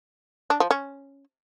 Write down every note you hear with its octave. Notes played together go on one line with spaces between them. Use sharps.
D4
F3
C#4